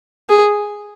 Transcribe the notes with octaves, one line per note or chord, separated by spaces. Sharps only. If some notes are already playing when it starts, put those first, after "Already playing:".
G#4